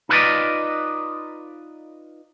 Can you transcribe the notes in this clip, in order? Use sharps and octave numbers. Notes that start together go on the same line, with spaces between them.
D#4 F4 B4 C5 D5 D#5